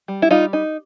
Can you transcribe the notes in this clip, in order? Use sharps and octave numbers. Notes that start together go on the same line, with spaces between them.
G3
E4
G3 D#4 F4
D#4